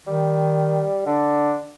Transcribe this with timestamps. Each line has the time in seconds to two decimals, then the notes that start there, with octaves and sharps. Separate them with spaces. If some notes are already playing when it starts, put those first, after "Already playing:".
0.07 D#3 G3
1.06 D3 D4